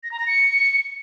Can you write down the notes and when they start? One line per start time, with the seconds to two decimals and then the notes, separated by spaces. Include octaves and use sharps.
0.03 A#6
0.11 A#5
0.19 A#6
0.27 C#7